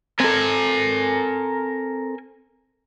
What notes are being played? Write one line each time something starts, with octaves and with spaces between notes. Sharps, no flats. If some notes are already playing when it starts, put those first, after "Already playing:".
C4 A4 A#4 G#5